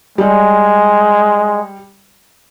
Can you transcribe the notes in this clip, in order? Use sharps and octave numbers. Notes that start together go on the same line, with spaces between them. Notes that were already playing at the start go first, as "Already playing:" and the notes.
G3 G#3